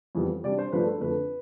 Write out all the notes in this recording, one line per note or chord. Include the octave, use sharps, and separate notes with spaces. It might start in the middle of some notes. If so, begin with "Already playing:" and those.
F2 E3 G3 B3
C3 G3 D4 D5
C5
G2 F3 A3 D4 B4
A4
F2 D3 A3 B4